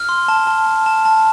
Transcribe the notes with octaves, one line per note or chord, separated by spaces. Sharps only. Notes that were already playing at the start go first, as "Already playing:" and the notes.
Already playing: F6
C6
A5
A5
A5
A5
A5